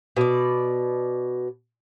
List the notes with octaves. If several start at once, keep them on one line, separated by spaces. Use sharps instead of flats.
B2 D5